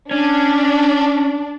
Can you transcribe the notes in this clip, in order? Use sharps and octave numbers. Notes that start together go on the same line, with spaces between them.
C#4 D4